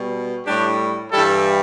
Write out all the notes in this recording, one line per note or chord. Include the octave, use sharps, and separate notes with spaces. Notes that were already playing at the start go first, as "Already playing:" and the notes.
Already playing: B2 G3
A2 G3 D4 G4
G2 E3 G3 E4 A4